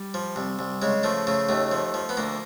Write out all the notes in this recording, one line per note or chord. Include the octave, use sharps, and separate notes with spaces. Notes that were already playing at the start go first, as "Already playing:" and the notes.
Already playing: G3
F3
C2
C2
C#3 G#3
F3 A3
C#3 A3
D#2 A3
F3
F3
B3
D2 A#3